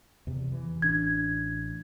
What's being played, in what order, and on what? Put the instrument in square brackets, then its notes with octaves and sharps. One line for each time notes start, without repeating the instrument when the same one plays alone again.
[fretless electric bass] E2 C3
E3
[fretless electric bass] A1 D4 [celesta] G#6